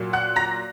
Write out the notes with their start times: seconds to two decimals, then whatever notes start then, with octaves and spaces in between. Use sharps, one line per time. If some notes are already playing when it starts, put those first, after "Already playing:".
Already playing: A#2 F#3 A#3
0.13 F#5 F#6
0.36 A#5 A#6